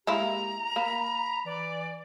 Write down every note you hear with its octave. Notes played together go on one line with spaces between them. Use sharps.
G#3 A#3 E4 G4 A#5
A#3 B5
E3 D5